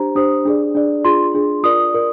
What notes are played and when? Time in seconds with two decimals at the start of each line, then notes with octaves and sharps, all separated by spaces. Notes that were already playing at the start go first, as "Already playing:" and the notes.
Already playing: D4 G4 C5 A#5
0.15 D4 G4 C5 D#6
0.45 D4 G#4 D5
0.75 D4 G#4 D5
1.05 D4 F4 G#4 C6
1.34 D4 F4 G#4
1.63 F4 A#4 D5 D#6
1.94 F4 A#4 D5